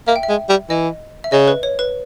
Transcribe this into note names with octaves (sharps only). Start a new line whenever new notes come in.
A#3 E5
G5
E5
G#3
G3
E3 D#5
E5
C#3 D#5
B4
C#5
B4